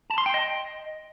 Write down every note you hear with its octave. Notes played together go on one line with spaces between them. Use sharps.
A5
C6
G5
D#5